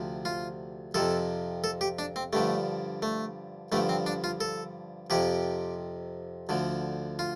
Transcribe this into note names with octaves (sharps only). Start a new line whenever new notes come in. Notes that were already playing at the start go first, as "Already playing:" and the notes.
Already playing: D2 C3 F3
F4
F2 C3 F3 A4
A4
G4
D4
C4
G2 D3 F3 A3
A3
G2 D3 F3 A3
C4
D4
F4
A4
F2 C3 F3 G4
D2 D3 F3
F4